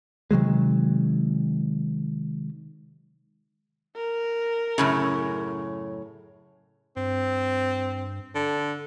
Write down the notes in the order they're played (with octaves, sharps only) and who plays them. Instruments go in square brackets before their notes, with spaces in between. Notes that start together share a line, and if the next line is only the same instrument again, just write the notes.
[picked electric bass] C3 D#3 F#3 G#3
[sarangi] A#4
[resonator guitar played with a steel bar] F#2 A2 C#3
[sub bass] G2 [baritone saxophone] C4
[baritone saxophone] D3